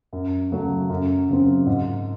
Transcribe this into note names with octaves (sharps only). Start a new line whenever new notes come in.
F#2
C#3 F#3 A3
F#2
C#3 F#3 C4
G#2